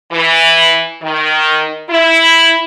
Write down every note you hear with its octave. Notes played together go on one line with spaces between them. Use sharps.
E3
D#3
E4